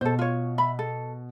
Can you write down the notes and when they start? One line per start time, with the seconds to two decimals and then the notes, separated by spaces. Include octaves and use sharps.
0.01 B2 A4 C5
0.19 F4 C#5
0.58 E5 B5
0.79 A4